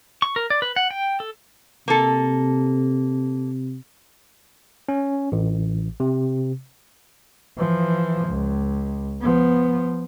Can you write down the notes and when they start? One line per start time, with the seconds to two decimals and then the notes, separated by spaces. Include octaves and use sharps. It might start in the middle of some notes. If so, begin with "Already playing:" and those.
0.22 C#6
0.36 A#4
0.50 D5
0.62 B4
0.76 F#5
0.91 G5
1.20 A4
1.88 C3 A#3 A4
4.89 C#4
5.32 A1
6.00 C3
7.58 E3 F3
8.28 C#2
9.21 F3 B3